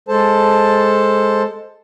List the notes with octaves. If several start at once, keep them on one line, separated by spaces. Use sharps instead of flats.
G#3 A4 C5 A5